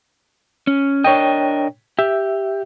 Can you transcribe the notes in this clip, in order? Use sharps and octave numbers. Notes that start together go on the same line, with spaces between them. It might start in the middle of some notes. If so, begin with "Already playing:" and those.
C#4
D4 A#4 C#5 D#5 G5
G4 E5